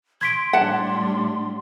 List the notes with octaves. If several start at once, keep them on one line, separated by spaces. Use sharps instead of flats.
C6 G#6 B6 D7
A2 G3 D4 F#5 A5